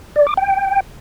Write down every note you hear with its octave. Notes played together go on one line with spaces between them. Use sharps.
D5
D6
G5